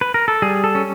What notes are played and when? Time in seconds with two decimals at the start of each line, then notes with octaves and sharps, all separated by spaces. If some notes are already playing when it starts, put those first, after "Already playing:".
0.01 B4
0.14 A#4
0.28 A4
0.42 G3 G#4
0.64 A4
0.75 C#4